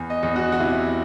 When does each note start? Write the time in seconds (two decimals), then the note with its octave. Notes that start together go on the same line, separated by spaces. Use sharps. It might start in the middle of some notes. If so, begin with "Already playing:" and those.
Already playing: E2
0.10 D#5
0.23 E2
0.36 F#4
0.52 F#4
0.60 C3 E4